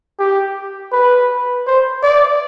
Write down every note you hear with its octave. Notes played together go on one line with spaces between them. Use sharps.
G4
B4
C5
D5